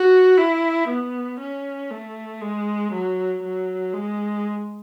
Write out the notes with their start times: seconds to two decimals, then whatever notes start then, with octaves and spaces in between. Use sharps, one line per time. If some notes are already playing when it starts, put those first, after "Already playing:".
Already playing: F#4
0.38 E4
0.88 B3
1.40 C#4
1.91 A3
2.41 G#3
2.92 F#3
3.43 F#3
3.93 G#3